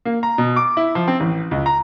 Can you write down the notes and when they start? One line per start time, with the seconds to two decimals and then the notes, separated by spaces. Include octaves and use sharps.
0.05 A#3
0.23 A#5
0.38 B2
0.56 D6
0.77 E4
0.95 F3
1.08 C4
1.20 A1
1.51 C#2
1.66 A#5